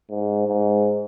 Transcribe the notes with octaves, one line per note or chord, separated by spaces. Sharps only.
G#2
G#2